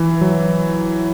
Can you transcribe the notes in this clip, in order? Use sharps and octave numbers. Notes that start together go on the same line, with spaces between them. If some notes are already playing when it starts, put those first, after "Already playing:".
Already playing: E3
F#3